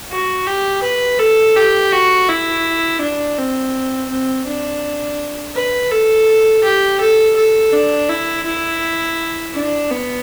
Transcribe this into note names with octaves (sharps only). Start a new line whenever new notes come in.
F#4
G4
B4
A4
G4
F#4
E4
D4
C4
C4
D4
B4
A4
G4
A4
A4
D4
E4
E4
D4
B3